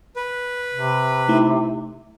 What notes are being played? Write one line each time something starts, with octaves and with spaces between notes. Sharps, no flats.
B4
C3
A3 D#4 E4